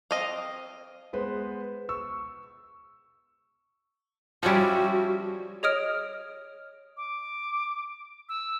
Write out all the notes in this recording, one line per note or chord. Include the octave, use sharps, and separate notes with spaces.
C4 D#5 F5
G#3 B3 B4 C5
C#6 E6
F3 G3 C#4 E4 F#4 F#5
G#4 C#5 D#5 D#6 F6 D7
D6
E6